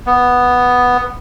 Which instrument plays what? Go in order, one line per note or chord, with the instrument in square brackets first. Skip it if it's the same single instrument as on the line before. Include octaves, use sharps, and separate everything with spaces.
[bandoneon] B3